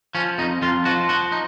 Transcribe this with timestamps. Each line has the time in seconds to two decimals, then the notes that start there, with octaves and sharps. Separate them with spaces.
0.15 F3 C#4
0.38 F2 D#4
0.62 F2 F4
0.85 F3 F#4
1.09 F3 F#4
1.32 D#4